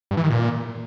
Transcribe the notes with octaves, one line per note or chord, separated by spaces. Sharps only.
G2
E3
D#3
A#2